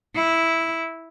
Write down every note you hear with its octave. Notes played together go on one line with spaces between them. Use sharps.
E4